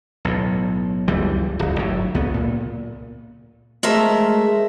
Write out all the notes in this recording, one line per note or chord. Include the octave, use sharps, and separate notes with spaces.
B1 A2
F#1 C#2 E3 G3
D1 G1
G1 A2 F#3
C#2 B3
A#2
G#3 A3 A#4 C5 E5